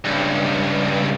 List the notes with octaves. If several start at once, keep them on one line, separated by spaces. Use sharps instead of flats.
C#2 G2